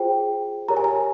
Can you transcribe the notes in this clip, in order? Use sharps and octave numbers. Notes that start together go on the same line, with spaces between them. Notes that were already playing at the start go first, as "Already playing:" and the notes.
Already playing: F4 G#4 C5 G5
G4 A#4 C#5 A#5
G#5
A#5